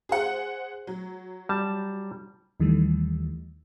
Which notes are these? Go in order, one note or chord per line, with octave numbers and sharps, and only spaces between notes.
G#4 C5 F#5
F#3
G3 A5
D#2 D#3 E3 G3 A3